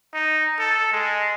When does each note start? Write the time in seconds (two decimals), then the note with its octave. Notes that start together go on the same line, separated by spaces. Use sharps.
0.14 D#4
0.59 A4
0.92 G#3